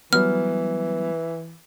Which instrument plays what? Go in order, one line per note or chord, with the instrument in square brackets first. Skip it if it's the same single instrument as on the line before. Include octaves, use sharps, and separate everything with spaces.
[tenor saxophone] E3 [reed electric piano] F#3 G3 B3 [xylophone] F6